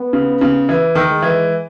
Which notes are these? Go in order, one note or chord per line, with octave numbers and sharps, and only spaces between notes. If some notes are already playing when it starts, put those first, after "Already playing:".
Already playing: B3
C#3
C#3
E3
D#3
G#3
E3